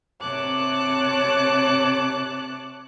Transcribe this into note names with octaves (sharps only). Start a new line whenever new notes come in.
C3 C4 C#5 A5 D6 F#6